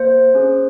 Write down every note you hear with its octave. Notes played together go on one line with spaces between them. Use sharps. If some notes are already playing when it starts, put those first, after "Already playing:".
Already playing: A#3 C5
C#4 G#4